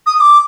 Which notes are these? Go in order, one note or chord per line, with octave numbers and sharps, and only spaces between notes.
D#6
D#6
D6